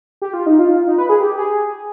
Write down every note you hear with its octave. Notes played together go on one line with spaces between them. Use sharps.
G4
F4
D#4
F4
D#4
B4
G#4
G4
G#4